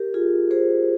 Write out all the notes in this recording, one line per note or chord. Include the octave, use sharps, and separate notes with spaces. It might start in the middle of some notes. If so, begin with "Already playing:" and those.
Already playing: G4 A#4
F4 G#4
G#4 C5